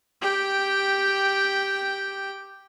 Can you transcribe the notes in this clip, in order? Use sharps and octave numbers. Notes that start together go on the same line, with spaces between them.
G4 G5